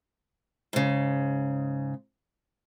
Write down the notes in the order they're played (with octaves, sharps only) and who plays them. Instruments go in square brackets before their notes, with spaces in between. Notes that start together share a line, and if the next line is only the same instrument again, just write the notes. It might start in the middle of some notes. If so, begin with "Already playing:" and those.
[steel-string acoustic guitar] G#2 C#3